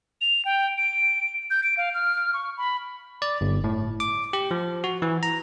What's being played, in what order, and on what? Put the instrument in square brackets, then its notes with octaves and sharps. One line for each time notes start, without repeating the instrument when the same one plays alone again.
[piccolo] F7
G5
D7
G6
D7
F5
F6
C#6
B5
[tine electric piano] D5
G1
A2
D6
G4
F3
F#4
E3
A#5